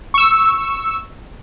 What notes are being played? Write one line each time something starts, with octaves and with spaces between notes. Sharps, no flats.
C#6 E6